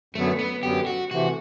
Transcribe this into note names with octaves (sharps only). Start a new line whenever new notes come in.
F#2 D3 F#3 A3 B3
B3
F#2 D3 F#3 B3 G4
F#4
C3 E3 A3 F#4